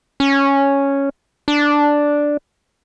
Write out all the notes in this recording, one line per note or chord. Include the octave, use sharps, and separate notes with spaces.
C#4
D4